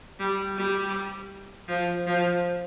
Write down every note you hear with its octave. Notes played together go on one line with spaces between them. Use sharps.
G3
G3
F3
F3